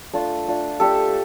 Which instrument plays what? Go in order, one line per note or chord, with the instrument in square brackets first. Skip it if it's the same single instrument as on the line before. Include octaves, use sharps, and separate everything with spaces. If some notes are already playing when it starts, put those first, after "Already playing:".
[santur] A3 D4 F4
A3 D4 F4
A3 D4 F4 G4 A4